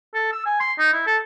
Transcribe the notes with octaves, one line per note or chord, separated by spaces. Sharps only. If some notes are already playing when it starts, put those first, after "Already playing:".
A4
E6
G#5
C6
D#4
E4
A4